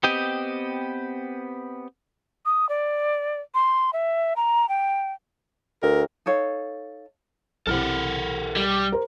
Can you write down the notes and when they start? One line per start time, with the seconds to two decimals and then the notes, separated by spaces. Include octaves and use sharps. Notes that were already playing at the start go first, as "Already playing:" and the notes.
0.03 B3 C4 G4 D#5 G5
2.45 D#6
2.69 D5
3.55 C6
3.93 E5
4.36 A#5
4.69 G5
5.83 D2 A#4
6.26 D#4 A4 C#5 F5
7.67 B1 C3 E4 A4 A#4 F#5 F6
8.56 G3
8.92 A#4 C5